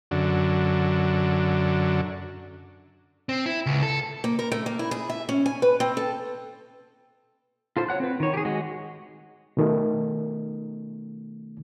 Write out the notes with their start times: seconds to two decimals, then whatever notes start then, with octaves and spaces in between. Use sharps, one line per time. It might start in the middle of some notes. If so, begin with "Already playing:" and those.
0.11 F#2 D3
3.29 C4
3.46 E4
3.66 C#2
3.83 A4
4.24 A#3
4.39 A#4
4.52 A3
4.66 A#3
4.79 E4
4.91 G#4
5.10 E5
5.29 C#4
5.46 G#5
5.62 B4
5.80 C4
5.97 A4
7.77 F4 A4 C5
7.89 C#5 F#5 F#6
8.00 C4 B4
8.20 D#3 C#5
8.34 G4 G#4
8.45 G#3 F#4
9.57 B2 D#3 A3